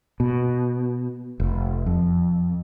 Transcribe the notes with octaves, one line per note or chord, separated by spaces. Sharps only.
B2
F1
F2